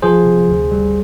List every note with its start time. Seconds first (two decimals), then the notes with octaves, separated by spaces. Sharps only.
0.02 F3 G#4 C5
0.25 C3
0.48 D2
0.71 G3